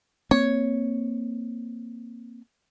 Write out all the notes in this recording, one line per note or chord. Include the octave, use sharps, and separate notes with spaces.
A#3 C4 C#5